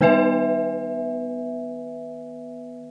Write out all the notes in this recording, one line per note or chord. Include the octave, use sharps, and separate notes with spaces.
D#3 B3 B4 E5 G#5